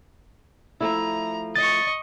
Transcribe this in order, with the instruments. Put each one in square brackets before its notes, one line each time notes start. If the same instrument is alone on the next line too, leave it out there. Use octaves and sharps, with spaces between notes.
[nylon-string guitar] F3 A3 E4 [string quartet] A#5
[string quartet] D#5 C#6 [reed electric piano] A6